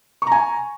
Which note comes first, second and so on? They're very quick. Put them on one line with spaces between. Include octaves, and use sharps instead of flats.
C#6 A#5 G#5